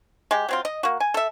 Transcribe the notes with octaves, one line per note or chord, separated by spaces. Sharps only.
G#3 G4
F#3 C4 F4
D#5
A#3 F#4
G#5
A4 E5